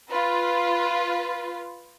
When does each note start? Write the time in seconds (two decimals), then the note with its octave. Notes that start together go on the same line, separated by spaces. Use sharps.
0.10 F4 B4